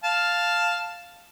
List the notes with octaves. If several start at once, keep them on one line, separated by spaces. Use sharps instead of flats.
F5 A5